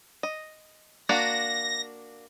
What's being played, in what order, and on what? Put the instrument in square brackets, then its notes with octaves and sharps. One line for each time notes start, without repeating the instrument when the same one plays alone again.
[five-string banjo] D#5
[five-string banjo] A#3 D4 F#4 [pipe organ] A#6